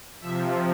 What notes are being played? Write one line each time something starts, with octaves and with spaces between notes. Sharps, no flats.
C3 F3 E5